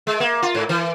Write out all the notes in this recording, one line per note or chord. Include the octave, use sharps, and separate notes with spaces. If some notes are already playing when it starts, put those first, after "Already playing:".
G#3
A#3
F4
G#2
E3